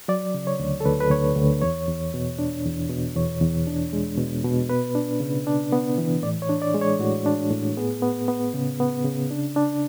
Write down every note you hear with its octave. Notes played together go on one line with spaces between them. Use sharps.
F#3 D5
C#3
C#5
D2
A4
D2 B4
B4
D2 C#5
D2
E2 C#5
E2
B2
D4
E2
B2
E2 C#5
E2
D4
G#3
B2
B2
B3 B4
D4
C#3
D4
B3
E3
A2 D5
C#5
D4
D5
G#3
C#5
A2 F#4
D4
A2
B3 G#4
B3
B3
C#3
B3
C#3
D4
D4